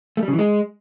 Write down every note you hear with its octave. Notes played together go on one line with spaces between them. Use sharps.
A3
G3
C#3
E3
G#3